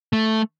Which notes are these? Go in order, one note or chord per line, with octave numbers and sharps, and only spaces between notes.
A3